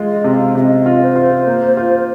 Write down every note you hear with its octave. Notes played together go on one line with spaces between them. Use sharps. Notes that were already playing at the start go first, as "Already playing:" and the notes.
Already playing: G#3 F4
D#5
C3
F5
C3 D#5 F5
F4
C5
F4
A#3
F4